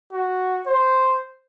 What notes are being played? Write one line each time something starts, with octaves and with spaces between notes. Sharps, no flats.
F#4
C5